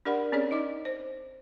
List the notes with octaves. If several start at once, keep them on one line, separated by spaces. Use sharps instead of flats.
D4 G4 A#4 D5 F#5 B5
C4 C#4 G#4 C#5 D5
D#4 D#5 D6
C5